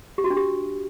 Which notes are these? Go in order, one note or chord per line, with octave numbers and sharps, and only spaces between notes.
G4
F#4
D4
G4